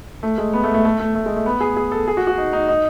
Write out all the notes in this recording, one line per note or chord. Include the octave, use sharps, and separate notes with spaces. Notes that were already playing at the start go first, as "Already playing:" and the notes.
A3
G#3
B3
A3
A3
A3
A3
A3
G#3
A3
B3
G#4
G#4
A4
G#4
F#4
F#4
D#4
D#4
D#4